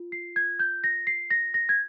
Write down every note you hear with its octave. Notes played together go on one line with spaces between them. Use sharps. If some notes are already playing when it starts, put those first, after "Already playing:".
Already playing: F4
C7
G#6
G6
A#6
C7
A#6
A#6
G#6